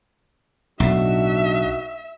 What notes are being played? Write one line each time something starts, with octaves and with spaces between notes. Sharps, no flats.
B1 A2 D4 D#4 F#4 E5